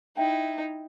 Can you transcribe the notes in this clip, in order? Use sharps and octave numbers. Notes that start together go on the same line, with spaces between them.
D#4 E4 E5 G5